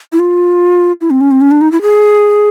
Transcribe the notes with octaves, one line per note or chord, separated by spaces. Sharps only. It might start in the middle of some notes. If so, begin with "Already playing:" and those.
E4
F4
E4
C4
C#4
C4
C#4
D4
D#4
E4
G#4